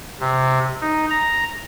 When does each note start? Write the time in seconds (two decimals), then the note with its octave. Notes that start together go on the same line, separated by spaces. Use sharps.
0.20 C3
0.81 D#4
1.11 A#5